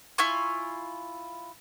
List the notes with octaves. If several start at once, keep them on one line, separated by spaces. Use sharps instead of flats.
E4 F4 G#5 C#6